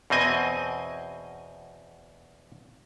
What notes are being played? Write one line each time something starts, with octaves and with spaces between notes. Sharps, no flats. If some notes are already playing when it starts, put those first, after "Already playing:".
E2 B2 C4 D#5 G#5